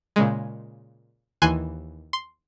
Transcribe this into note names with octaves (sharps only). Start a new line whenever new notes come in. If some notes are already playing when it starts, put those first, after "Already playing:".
A#2 C#3 G#3
D#2 E3 G#5 C6 F#6
C6